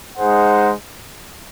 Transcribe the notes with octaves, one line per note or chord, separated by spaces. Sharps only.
G#3 D#4 G#4 C5 F#5